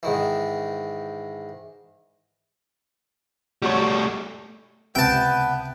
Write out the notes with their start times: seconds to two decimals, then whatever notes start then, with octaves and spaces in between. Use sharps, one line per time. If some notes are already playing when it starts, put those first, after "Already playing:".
0.03 G#2 D#3 E3
3.62 G3 A3 F#4 C#5
4.95 C#2 C3 B3 B4 E5 G5 A5